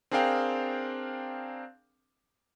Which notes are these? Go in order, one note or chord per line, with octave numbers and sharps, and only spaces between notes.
C4 D4 G#4 A#4 F5 G5